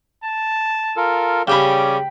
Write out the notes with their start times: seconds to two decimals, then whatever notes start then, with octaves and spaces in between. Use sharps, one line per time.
0.24 A5
0.97 F4 A4 A#4
1.48 C#3 G3 C#4 G4 G#4 D5 G5 B5